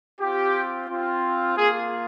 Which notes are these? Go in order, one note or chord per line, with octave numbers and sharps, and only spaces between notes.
C4 F4 G4
C4 F4
A#3 F4 G#4